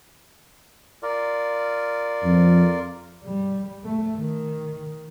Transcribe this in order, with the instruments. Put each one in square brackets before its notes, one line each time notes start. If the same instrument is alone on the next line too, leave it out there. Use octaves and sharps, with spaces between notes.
[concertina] F4 A#4 D5
[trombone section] F2
[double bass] G3
A3
D#3